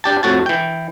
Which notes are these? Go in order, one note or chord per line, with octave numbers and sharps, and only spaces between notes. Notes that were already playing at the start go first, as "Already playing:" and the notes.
D4 G4 A5
F2 A2 F#4 A5
E3 G5